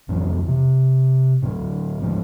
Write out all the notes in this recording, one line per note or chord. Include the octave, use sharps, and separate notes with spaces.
F2 A2 E3 F#3
C3
A2 D3 F#3
D#1 D2 F3 G#3